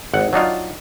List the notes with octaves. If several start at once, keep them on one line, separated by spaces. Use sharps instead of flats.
G#1 F#5
F#3 D4 D#4 F4